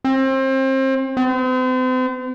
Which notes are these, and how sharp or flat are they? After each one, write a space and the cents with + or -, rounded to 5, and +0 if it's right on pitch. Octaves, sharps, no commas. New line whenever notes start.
C4 +30
C4 -40